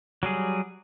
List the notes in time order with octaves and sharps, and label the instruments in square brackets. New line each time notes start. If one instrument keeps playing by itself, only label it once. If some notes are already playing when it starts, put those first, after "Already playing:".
[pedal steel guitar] F#3 G3 G#4